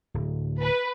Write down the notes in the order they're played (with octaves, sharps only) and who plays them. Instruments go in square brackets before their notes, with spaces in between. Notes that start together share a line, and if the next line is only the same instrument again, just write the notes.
[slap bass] D1
[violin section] B4